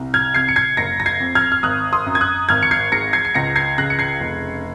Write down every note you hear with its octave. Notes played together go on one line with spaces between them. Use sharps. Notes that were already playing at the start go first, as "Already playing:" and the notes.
Already playing: C2
F6 G#6
C3 G#6 C7
C#7
G#6 C7
F#1 A#6 C#7
A#6
G#6 C7
F2
F6 G#6
F6
G#1 D#6 F#6
C6 D#6
F#2
G#6
D#6 F#6
G#1 F6 G#6
C#7
G#6 C7
G#2 A#6 C#7
G#6 C7
C7
C#2 A#6 C#7
G#6 C7
C#3 F#6 A#6
C#7
G#6 C7
F1